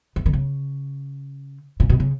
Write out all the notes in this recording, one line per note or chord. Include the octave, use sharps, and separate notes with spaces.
E3
D#3
C#3
A#2
B2
C#3